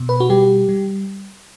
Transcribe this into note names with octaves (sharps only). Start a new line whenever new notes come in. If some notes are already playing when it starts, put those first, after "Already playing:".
Already playing: B2
B4
F#4
G3 G4
G3